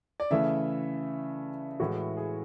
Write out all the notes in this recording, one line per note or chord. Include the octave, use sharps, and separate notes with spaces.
D5
C#3 E3 A3 E5
A2 E3 G#3 F#4
G#4